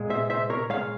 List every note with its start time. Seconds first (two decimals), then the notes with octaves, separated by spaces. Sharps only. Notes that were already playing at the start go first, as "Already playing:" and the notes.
Already playing: A#2 G#3
0.10 C5 E5
0.30 C5 E5
0.50 A#4 C#5
0.70 A#2 G#3 C#5 F5